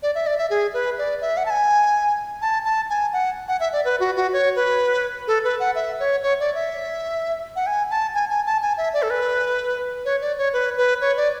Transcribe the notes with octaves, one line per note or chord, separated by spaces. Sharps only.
D5
E5
D5
E5
G#4
B4
D5
E5
F#5
A5
G#5
A5
A5
G#5
F#5
F#5
E5
D5
B4
F#4
F#4
C#5
B4
A4
B4
F#5
E5
C#5
C#5
D5
E5
F#5
G#5
A5
G#5
G#5
A5
G#5
E5
D5
A4
B4
C#5
D5
C#5
B4
B4
C#5
D5